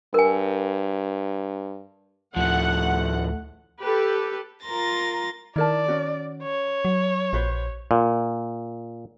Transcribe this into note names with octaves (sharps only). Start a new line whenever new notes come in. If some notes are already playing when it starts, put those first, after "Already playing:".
G2 A#4 G#5
D2 A2 F3 A3 F#5
G4 A4 B4
F4 A#4 A#5 C6 A6 A#6
D#3 E4 A#4 D5 A5
C#4 F#4
C#5
F#3
A#1 F#4 B4 C5
A#2